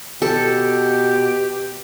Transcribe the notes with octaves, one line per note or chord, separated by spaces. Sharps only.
B2 G4 A4